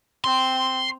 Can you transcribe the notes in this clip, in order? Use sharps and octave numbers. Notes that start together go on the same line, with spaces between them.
C4 C6